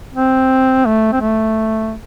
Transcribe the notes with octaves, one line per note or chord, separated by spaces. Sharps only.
C4
A3
C4
A3